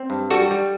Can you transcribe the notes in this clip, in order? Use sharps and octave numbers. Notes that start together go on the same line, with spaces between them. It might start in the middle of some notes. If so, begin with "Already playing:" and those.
Already playing: C4
G2
G3 F#4 A4
G3